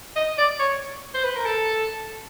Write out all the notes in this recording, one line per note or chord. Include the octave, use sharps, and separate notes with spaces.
D#5
D5
C#5
C5
B4
A#4
A4